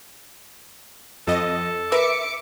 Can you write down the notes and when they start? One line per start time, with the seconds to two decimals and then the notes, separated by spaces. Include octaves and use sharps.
1.27 F2 A4 D#5
1.92 A#4 B4 E5 D6 C#7